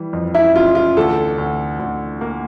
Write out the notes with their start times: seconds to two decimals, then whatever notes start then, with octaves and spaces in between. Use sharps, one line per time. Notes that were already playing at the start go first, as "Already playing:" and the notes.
Already playing: E3 G3
0.13 F2
0.35 E4
0.55 E3 F4
0.75 F4
0.97 D2 A4
1.38 D2
1.79 D2
2.21 A#3